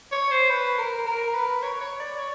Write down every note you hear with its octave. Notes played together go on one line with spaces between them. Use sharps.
C#5
C5
B4
A#4
A#4
B4
C#5
C#5
D5
C#5